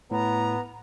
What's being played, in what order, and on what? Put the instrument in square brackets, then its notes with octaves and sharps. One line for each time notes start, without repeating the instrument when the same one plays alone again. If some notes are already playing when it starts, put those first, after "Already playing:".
[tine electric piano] A2 [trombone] B3 [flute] A#5